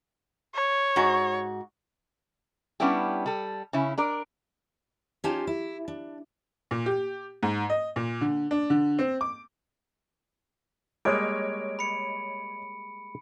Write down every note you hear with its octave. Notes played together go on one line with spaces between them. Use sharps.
C#5
G#2 F#4
G3 B3 C#4 D4 E4 G4
G3 A4
C#3 C#4 E4
D4 A#4 D5
C#4 D#4 F4 G4 G#5 A5
E4
D4
A#2
G4
G#2
D#5
A#2
D3
D4
D3
C4
D6
G3 G#3 A#3 C#5 D#5 D7
B5 C#7